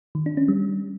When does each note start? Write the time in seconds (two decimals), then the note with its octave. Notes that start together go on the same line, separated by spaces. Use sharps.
0.15 D#3
0.26 D4
0.37 C#4
0.48 G3